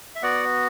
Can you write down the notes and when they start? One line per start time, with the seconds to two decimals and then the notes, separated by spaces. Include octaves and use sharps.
0.15 E5
0.23 B3 F#4 D5 F#5